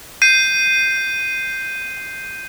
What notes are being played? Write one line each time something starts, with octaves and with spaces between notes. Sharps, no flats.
G6 C7 D#7